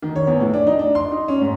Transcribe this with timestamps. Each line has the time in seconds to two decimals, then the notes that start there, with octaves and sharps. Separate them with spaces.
0.02 D#3
0.16 C#5
0.27 E2
0.40 A2
0.54 D4
0.67 D#4
0.79 D4
0.95 C6
1.12 D#4
1.28 C#4
1.41 G#2